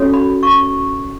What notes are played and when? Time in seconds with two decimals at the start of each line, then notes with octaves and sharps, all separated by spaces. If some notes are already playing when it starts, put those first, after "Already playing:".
Already playing: C#4 F#4 A4 C#5
0.14 B5
0.43 C#6